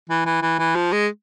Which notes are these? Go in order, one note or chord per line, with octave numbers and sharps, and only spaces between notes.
E3
E3
E3
E3
F3
G#3